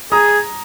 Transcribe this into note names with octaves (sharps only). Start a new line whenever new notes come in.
G#4 A#5 D#6